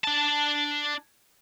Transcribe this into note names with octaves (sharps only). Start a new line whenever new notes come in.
D4 A5